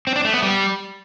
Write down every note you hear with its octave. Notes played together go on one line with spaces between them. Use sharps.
C4
D4
A3
B3
G3